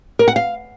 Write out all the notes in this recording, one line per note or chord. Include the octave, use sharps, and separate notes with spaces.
A#4
F#5
F5